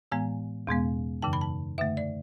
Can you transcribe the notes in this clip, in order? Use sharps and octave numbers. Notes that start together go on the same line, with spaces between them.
A2 E3 G#3 B3 G#5
E2 B2 G#3 B3
F#2 C#3 E3 A5
B5
A5
F#2 D3 A3 E5
D5